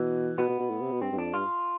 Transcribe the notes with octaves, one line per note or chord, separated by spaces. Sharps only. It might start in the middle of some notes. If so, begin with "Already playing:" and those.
Already playing: B2 E3
B2 B3
B2
B2
A2
C3
B2
G2 C4
G2
F2 D4
G2 F4